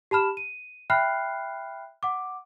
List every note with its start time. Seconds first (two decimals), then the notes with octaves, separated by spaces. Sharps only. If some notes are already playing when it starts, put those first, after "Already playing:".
0.11 G4 A5 B5 F6 E7
0.37 D#7
0.90 E5 G5 B5 F6 F#6 C7
2.03 F#5 D6